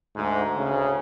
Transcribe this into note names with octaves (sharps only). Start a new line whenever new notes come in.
D2 G#2
D2 C#3